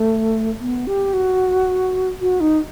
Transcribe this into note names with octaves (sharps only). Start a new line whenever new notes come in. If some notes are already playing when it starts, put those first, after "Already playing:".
Already playing: A3
B3
G4
F#4
F#4
D#4